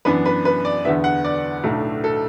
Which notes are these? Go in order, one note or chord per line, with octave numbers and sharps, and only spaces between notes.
F#2 E3 B3 D4 B4
B4
B4
D5
E2 D3 B3 E5
F#5
D5
B1 A2 A3 D4
A4